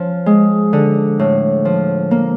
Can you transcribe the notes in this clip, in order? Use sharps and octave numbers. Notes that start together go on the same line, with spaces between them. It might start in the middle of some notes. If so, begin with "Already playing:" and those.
Already playing: F3 C#4
G#3
D3
A2
F3
A#3